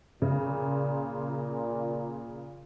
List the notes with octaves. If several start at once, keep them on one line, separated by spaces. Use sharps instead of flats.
A#2 C#3